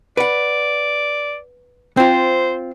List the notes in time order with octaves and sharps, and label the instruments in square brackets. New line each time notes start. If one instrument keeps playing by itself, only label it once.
[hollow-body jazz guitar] B4 F#5 [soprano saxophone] D5
[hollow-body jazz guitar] C4 F4 [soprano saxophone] C5